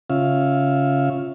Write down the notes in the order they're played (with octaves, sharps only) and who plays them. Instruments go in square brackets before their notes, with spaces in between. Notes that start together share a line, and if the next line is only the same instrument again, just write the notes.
[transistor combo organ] C#3 C#4 F4 E5 F5